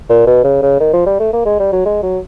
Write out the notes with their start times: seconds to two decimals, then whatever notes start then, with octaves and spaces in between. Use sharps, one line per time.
0.09 A#2
0.27 B2
0.44 C#3
0.62 C#3
0.80 D#3
0.93 F3
1.06 G3
1.20 A3
1.33 A#3
1.45 G#3
1.60 G3
1.72 F#3
1.85 G#3
2.03 F#3